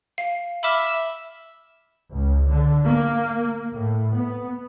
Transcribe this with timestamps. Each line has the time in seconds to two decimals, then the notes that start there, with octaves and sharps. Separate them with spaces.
0.18 F5
0.63 E5 B5 D6 F6
2.12 C#2
2.48 D3
2.83 A#3
3.72 A2
4.14 B3